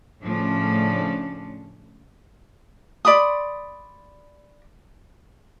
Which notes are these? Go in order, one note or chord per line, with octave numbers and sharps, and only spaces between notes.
A2 C#3 F3 C#4 D4
D5 B5 C6 D#6